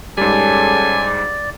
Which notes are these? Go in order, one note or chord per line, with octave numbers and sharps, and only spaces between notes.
G#2 G3 C#4 G#4 A4 D5 G#5